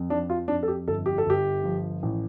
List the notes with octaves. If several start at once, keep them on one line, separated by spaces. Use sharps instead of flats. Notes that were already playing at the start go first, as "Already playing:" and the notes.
Already playing: F2
F3 D4
F4
F2 D4
A4
G4
G1 A4
G4
A4
G1 G4
F3
A1